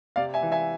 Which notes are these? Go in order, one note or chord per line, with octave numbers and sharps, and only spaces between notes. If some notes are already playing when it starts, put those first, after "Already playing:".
C3 D5 F5
E5 G#5
E3
E5 G#5